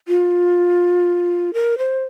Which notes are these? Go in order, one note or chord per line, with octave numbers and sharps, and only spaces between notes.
F4
A#4
C5